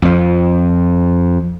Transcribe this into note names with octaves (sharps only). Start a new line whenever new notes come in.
F2 F3